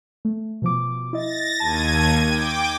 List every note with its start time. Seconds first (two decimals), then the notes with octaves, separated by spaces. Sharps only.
0.25 A3
0.62 B2 F3 D6
1.13 E4 D#5 A6 A#6
1.60 D#2 A5 G#6 D#7
2.27 G5 D6